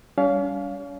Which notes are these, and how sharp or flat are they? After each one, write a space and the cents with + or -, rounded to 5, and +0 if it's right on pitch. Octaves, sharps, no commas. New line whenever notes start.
G3 +0 C#4 +40 F5 +0